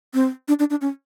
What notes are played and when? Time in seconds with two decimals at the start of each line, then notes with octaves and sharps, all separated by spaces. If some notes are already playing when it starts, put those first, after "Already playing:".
0.14 C4
0.48 D4
0.59 D4
0.70 D4
0.81 C#4